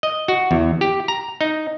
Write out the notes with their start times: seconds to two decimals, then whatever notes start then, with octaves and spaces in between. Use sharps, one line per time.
0.03 D#5
0.28 F#4
0.51 E2
0.81 G4
1.08 A#5
1.41 D#4